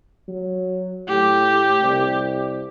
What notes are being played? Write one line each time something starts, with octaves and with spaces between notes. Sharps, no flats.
F#3
A2 G4
C2